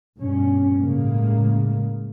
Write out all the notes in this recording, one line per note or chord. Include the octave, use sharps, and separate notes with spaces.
G2 B2 C#4
A2 C#3 G#3 A#3